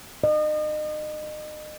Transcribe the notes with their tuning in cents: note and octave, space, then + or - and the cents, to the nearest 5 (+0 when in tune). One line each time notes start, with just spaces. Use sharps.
D#5 -35